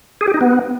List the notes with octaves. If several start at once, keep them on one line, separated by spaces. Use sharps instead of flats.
G#4
G4
D#4
B3